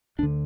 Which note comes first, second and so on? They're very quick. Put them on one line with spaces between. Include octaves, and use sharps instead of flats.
D2 D4 D3